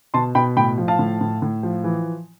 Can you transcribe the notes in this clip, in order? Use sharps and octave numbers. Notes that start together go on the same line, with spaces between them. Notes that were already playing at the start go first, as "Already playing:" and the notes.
B2 A5 C6
B2 G5 B5
A2 G5 B5
F3
F5 A5
A2
A2
A2
F3
E3